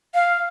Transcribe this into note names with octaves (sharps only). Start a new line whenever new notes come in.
F5